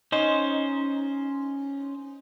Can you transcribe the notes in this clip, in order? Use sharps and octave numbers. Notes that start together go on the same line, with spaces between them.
C#4 D#4 C5